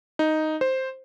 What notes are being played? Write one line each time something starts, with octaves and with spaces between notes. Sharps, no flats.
D#4
C5